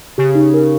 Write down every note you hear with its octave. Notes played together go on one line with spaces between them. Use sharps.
C#3 G4
D#4
A#4